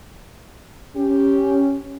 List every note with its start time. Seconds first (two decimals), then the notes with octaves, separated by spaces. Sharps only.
0.96 C#4 G4